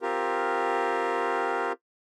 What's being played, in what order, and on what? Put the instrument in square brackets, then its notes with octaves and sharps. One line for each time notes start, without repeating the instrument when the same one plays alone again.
[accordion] C4 F4 G4 A#4